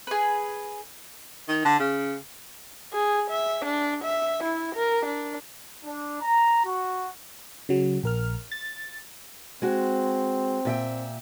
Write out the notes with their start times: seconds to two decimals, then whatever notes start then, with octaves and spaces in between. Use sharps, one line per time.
0.07 G#4 B4
1.48 D#3
1.65 D3
1.79 C#3
2.93 G#4
3.30 E5
3.65 D4
4.04 E5
4.44 E4
4.75 A#4
5.05 D4
5.85 D4
6.22 A#5
6.65 F#4
7.69 C#3 F#3
8.03 A#1 A#4 F6
8.52 A6
9.62 G#3 C4 F#4
10.65 A#2 E5 G5